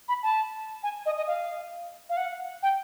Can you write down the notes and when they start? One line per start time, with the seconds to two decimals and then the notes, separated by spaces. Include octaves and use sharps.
0.08 B5
0.23 A5
0.83 G#5
1.06 D#5
1.17 D#5
1.27 F5
2.10 F5
2.17 F#5
2.63 G5